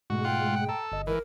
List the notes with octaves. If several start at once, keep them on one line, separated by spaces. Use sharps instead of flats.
G#2 B2 G#3 A3 F#4
F4 F#5 G5
F#5
A4 A#5
G1 D#5
G#2 E3 A#4